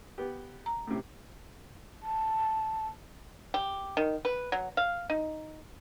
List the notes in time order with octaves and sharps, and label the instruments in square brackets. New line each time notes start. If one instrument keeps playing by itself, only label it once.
[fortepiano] B3 G4
[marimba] A#5
[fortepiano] A2 C3
[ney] A5
[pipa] G4
D#3
B4
F#3
F5
D#4